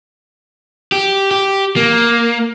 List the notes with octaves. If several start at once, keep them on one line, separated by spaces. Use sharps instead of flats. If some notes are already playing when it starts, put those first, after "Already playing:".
G4
G4
A#3